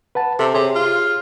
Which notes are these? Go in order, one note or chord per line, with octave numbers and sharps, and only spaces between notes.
B4 F#5 A5
C3 A4
C3 G4 G#4 C#5
F4